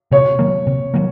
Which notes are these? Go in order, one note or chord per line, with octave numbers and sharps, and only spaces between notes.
C3 C#5
D#3 F#3 A#3
C3
D#3 F#3 A#3